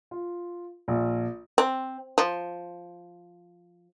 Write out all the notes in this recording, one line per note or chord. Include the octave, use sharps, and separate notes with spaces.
F4
A#1
C4
F3